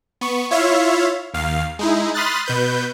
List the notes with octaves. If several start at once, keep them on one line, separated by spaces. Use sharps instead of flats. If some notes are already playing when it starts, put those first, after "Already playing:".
B3 C#6
E4 F4 C#5 E5 F5
D#2 F5
G#3 D#4 E4
B5 C6 D#6 F6 F#6 A6
B2 B4 G6